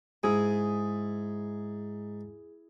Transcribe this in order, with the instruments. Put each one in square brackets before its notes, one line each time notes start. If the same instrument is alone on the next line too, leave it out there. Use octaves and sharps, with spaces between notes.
[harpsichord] G#2 [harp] E4 G#4